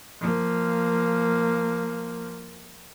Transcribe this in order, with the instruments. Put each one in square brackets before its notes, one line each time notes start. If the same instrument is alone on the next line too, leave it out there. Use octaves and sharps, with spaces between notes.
[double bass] F3 A#3